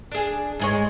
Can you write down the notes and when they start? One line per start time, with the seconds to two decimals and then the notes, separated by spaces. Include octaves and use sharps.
0.12 D4 G#4
0.59 G#2 G#3 C#5